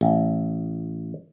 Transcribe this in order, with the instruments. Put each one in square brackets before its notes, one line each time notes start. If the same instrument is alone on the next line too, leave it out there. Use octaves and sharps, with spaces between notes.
[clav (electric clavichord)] A1